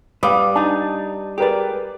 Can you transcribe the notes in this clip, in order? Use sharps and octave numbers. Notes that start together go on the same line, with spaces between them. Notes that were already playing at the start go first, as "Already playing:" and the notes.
G3 B4 F5 D6 D#6
D4 D#4 A5
G4 G#4 A#4 B4 D5